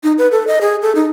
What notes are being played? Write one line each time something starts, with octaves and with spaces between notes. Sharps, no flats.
D#4
B4
A4
D#5
G#4
A4
D#4